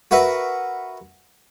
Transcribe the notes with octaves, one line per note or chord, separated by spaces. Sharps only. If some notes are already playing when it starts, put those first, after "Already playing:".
F#4 A#4 B4 E5